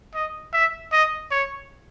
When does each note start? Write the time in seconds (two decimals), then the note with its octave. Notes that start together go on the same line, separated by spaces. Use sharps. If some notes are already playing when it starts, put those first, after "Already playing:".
0.15 D#5
0.53 E5
0.92 D#5
1.31 C#5